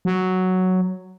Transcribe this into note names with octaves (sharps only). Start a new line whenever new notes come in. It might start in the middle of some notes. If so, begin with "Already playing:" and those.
F#3